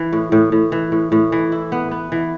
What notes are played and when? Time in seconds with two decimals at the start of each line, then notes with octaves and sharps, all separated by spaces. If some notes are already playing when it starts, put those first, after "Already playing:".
Already playing: E3
0.13 A2
0.32 A2
0.52 A2
0.72 E3
0.92 A2
1.12 A2
1.32 E3
1.52 E4
1.72 B3
1.91 B3
2.12 E3